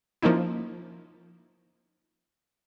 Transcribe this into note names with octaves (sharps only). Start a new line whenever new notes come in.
F3 A#3 C#4 D#4 E4